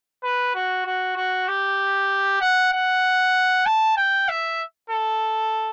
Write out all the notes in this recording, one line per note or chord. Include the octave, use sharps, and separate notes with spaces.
B4
F#4
F#4
F#4
G4
F#5
F#5
A5
G5
E5
A4